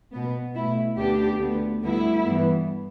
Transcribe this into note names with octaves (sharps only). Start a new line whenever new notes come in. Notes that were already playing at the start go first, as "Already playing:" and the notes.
B2 B3
B2 A3 E4
D2 D3 B3 D4 G4
D2 D3 B3
D2 D3 G3 B3 E4
G2 E3 G3 B3